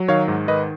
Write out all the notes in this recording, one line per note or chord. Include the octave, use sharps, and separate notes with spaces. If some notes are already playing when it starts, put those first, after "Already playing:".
Already playing: F#3
D#3 C#5 F5
G#2
D#3 B4 D#5